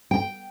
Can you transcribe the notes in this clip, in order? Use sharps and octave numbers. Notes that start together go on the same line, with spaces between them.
G5